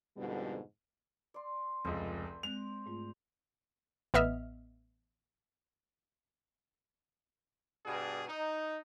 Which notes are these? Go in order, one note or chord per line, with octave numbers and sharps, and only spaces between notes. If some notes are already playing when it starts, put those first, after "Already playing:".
F2 G#2 B2 D3 G3
D5 C6
F1 C#2 C5
G#3 C4 F#6 F7
G#2 A3 F4
A1 B3 D#5 E5 F6
G2 B2 G#4
D#4